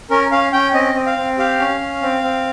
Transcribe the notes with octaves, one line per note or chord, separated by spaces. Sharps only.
C#4 A#4
C#4 F5
C#4 G5
C4 D#5
C4
F5
C4
G4 F5
C#4
C#4
C4
C4